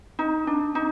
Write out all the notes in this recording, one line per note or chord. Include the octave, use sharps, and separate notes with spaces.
D#4
D4
D#4